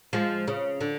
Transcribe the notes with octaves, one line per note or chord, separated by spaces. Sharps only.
F3 G#3
C#3
D3